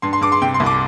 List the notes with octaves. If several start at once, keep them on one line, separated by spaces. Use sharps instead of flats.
G2 C6
C6
G2 D6
C6
C3 G5
C6
C2
D6